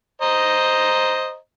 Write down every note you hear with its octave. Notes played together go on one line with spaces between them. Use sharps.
C5 D#5 A#5